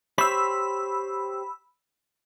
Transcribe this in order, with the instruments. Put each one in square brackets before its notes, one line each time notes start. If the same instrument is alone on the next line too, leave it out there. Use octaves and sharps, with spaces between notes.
[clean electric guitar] G4 C5 C#5 [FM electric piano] B5 E6